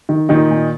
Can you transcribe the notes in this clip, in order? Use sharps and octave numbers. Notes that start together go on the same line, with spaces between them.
D#3
A#2 D#3 D#4
A#2